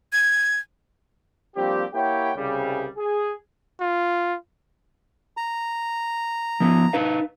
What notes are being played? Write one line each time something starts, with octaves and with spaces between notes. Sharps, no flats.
G#6
F3 G3 A#3 C4 D4 G4
A#3 E4 G4 C#5 F#5 G5
C2 C#3 G3
G#4
F4
A#5
F3 B3
D#4 B4 F5